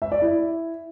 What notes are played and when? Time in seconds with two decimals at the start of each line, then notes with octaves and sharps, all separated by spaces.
0.02 E5
0.12 D5
0.22 E4